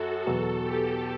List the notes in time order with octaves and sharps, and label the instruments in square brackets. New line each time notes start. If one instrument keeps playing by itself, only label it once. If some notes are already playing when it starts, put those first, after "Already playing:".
Already playing: [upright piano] F#2 [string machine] F#4 A4
[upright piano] E2 B2 F#3 [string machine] A4
[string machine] G4